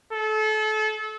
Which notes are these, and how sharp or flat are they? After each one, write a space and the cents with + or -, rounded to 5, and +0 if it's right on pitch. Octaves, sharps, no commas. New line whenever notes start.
A4 -30